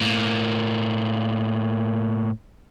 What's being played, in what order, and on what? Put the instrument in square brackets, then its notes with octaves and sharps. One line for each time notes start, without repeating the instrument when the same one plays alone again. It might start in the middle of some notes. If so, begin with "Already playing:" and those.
[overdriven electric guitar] A2 A#3